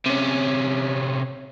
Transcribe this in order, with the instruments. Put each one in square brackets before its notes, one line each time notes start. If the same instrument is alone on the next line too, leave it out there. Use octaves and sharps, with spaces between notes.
[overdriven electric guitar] C3 C#4